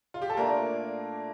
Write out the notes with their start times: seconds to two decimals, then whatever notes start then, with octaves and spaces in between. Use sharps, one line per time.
0.14 F4
0.22 G4
0.30 A4
0.37 A#2 A3 A#3 D4 F4 A#4